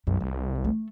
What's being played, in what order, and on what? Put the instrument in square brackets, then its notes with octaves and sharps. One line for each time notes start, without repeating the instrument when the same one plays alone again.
[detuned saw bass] B1 [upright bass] F#2 G3
[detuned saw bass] C2 [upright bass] G3
[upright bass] A3